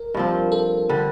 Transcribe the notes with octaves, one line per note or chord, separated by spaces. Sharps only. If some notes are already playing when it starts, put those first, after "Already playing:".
Already playing: A#4
G2 F3 C4
A4
D3 G3